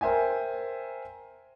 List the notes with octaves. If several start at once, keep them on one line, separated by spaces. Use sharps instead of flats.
A#4 C5 E5 G5 G#5